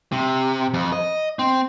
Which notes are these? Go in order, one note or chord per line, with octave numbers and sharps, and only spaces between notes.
C3
F2
D#5
C4